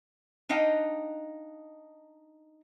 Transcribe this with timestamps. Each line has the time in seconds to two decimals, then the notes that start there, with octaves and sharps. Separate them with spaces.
0.49 D4 D#4 D#5 F5 G5